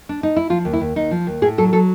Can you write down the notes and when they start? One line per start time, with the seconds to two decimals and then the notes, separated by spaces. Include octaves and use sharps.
0.09 D4
0.23 D#4
0.36 E4
0.50 F3 F4
0.65 D#2
0.73 E4
0.81 D#2
0.96 D#2 D#4
1.11 F3
1.27 D#2
1.42 A2 G#4
1.58 F#3 A4
1.73 F#3 A4